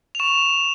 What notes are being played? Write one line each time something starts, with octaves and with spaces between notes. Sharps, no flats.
F7
C#6 E7